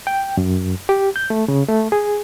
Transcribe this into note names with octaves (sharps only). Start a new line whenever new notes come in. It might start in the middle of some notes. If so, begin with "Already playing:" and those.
G5
F#2
G4
G6
A3
C#3
A3
G#4